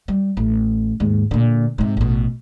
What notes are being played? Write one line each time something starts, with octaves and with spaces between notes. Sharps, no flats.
G3
A1
D#2 G#2
A#2 D3
G#2 C3
A1 B2